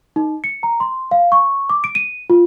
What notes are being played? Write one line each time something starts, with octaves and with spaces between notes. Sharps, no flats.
D#4
C#7
A#5
C6
F5
C#6
D6
D7
D#7
F4